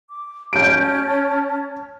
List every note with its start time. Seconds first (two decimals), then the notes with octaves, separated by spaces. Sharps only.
0.10 D6
0.53 C#4 A5 F6 G6 D7